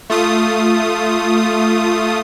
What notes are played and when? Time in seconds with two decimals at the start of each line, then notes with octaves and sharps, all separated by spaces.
0.10 A3 F4 D#6